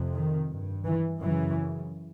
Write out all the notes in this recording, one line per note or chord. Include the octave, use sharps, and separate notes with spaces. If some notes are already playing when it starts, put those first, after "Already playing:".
Already playing: F2 C3
D#3
G2
E3
F#2 C#3 E3